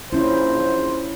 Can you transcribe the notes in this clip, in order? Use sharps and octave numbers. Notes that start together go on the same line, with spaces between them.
A#1 C#4 E4 C5